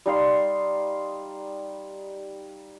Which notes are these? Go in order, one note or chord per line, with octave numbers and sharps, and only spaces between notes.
G3 D#4 F5 C6